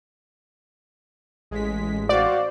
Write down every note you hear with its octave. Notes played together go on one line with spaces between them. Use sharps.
A1 G#3 B6
F#4 C5 D5 F5